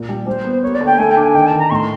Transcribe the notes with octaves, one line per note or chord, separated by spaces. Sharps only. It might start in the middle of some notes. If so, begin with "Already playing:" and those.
Already playing: A#2
G3
G3 C5
B3
A#3 C#5
D5
D3
G5
A3 G#5
G5
D4
G#5
D#3 G5
A5
D#3
A#5
A2 C6 C#6